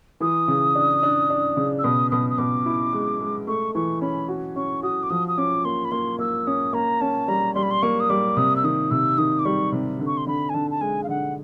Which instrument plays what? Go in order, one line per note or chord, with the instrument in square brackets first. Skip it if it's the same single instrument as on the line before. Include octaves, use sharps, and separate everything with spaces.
[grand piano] E3 [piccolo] D#6
[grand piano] C#3
D4
D4
D4
C#3
[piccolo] E6
[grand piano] B2 [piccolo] D#6
[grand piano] B2 [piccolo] D#6
[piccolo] D#6
[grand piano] B2 [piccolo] D6
[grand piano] E4
G#3
G#3
[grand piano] A3 [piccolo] C#6
[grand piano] E3 [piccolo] C#6
[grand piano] C#4 [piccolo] B5
[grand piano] F#4
[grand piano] C#4 [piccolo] C#6
[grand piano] F#4 [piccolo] D#6
[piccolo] D6
[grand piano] F3 [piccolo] D#6
[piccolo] D#6
[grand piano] C#4 [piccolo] D6
[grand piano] A#3 [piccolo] C6
[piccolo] B5
[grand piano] A#3 [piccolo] C6
[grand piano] A#3 [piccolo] E6
[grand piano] C#4 [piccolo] D#6
[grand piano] A#3 [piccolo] A#5
[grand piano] C#4 [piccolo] A5
[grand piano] G3 [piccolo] A#5
[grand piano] G3 [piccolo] C6
[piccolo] B5
C6
[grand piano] A#3 [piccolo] C#6
[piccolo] D#6
[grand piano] G3 [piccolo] D6
[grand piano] C3 [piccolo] D#6
[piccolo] E6
[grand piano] D#3 [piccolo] D#6
[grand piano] C3 [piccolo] E6
[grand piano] D#3 [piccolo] D#6
[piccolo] D6
[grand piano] G3 [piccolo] C#6
[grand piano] C3
D3
[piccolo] C#6
C6
[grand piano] D3 [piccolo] B5
[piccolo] G#5
[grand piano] D3 [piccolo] A5
[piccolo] A5
[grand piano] G#3 [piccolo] G#5
[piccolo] F5
[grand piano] D3 [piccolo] F#5